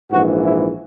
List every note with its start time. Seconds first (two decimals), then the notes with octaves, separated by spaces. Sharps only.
0.11 A#1 G#2 E3 F#4
0.43 E4